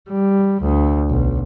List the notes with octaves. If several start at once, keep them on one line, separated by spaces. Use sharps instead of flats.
G3
D2
B1